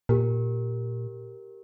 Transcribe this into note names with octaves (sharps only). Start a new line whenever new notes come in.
A#2 G4 A#4